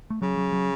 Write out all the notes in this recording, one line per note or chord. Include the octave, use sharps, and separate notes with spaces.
A3
C#3 F#3
F#3
F#3